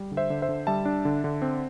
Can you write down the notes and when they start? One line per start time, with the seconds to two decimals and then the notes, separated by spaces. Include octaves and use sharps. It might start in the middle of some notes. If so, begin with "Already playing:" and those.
Already playing: G3
0.12 D3
0.17 C5 E5
0.30 D3
0.42 C5 E5
0.49 D3
0.67 G3 E5 A5
0.85 D4
1.05 D3
1.24 D3
1.42 C4